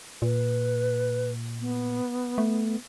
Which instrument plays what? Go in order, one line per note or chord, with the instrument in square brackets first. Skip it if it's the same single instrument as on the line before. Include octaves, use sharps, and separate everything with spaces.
[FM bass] A#2 [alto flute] B4
[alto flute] B3
[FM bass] A3